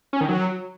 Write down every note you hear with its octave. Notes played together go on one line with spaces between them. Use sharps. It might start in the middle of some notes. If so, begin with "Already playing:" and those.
C#4
D#3
F#3